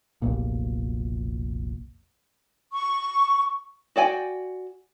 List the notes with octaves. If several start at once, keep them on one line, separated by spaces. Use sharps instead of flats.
F1 B1 A#2
C#6
F#4 D5 G5 G#5